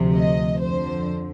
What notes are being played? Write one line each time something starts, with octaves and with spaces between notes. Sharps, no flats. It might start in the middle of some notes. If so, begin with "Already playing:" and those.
Already playing: D2 C3 F3
D#5
F2 D3 F3 C5